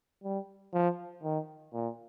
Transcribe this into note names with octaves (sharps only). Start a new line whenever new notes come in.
G3
F3
D#3
A#2